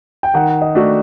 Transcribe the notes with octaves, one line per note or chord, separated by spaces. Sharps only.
G5
D#3 F#5
D#5
A3 D4 F#4